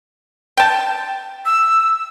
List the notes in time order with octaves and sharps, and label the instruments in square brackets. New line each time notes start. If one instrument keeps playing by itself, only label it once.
[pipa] G5 A5
[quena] E6